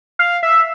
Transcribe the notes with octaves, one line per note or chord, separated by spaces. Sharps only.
F5
E5